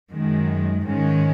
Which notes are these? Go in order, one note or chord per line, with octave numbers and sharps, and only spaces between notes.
F#2 D#3 G#3
G#2 D#3 G#3 C#4